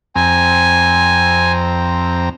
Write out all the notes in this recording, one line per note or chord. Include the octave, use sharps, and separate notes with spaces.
F2 C4 G#5 A#5